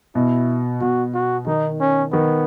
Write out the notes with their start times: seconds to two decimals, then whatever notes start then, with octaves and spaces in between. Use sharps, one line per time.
0.15 B2 E4
0.81 B2 F#4
1.14 F#4
1.47 D#3 D#4
1.81 C#4
2.12 D#3 B3